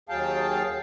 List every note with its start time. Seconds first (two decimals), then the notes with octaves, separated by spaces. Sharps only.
0.09 D#2 F#3 G#4 F5 G5 A5